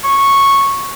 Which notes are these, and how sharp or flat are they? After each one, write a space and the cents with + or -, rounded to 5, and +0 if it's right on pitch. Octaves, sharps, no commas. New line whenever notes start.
C#6 -5